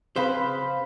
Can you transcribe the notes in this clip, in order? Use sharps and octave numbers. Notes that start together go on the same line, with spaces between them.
C#3 C4 B4 C5 F5 B5